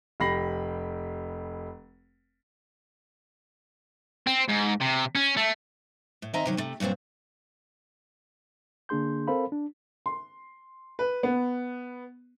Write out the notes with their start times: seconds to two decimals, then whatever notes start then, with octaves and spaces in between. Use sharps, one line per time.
0.20 F1 G4 B5 A#6 C7 F#7
4.27 C4
4.48 G#2
4.80 C3
5.15 C#4
5.37 A3
6.22 A2
6.34 D#3 C4 D#5 E5 G#5 A#5
6.46 C3 D#3 F#3
6.57 C3 A3
6.80 G2 A#2 F#3 C4 D4
8.89 D3 A#3 D4 G#4 C6 G6
9.28 C4 A4 A#4 C5 F5 B5
9.52 D4
10.06 C6
10.99 B4
11.23 B3